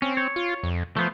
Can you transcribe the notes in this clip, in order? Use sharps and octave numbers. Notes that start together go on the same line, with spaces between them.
C4 C#4
C#5
F4
F2
F3 A3 B3 C5